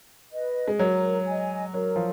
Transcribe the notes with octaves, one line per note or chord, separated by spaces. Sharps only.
B4 D#5
G#3
F#3 A#4
D#5 G#5
F#3 A#4
F3